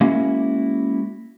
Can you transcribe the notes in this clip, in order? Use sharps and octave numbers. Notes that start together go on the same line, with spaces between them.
G#3 A#3 C#4 E4 F#4